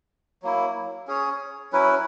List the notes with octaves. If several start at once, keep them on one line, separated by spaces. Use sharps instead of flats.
F#3 A#3 E4
C#4 G#4 C#5
F#3 C#4 E4 B4